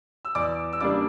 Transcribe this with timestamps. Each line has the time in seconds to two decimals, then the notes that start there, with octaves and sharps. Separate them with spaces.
0.25 E6
0.35 E2 D5 D6
0.73 E6
0.80 C#3 G3 A#3 D4 D5 D6